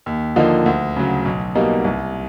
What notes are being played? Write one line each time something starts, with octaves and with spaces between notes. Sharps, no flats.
D#2
D3 F3 A#3 D#4
D2
C#3 F#3
B1
B2 G3 A#3 D#4
C2